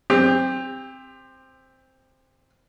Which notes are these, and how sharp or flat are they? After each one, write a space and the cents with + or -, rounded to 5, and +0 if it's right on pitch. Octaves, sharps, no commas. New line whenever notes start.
C4 +0 G4 +30